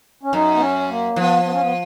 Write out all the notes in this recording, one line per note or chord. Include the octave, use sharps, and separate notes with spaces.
C#4
F#2 D#4
B3
C#4
A#3
F3 B3
B3
C#4
B3